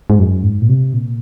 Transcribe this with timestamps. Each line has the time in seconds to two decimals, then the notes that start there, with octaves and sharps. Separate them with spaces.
0.10 G#2
0.19 F#2
0.43 G#2
0.62 A#2
0.69 C3
0.93 A#2